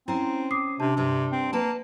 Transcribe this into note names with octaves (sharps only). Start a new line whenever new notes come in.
C4 C#4 E4 C5 A#5
D6 D#6 C7
C3 D4 A5
G2 C3 G3
C4
A#3 B4 A5